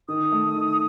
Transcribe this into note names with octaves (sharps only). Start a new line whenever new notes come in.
D#3 D#6
A3
D#3